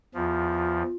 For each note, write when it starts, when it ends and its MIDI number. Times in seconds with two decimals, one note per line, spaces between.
0.14 0.83 40
0.14 0.83 53
0.14 0.97 65